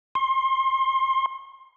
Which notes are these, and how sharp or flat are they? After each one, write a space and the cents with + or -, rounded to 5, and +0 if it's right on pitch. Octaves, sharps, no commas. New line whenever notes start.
C6 +30